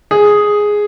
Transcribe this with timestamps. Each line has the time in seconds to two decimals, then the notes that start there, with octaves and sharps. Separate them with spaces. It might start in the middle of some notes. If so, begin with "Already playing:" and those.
0.11 G#4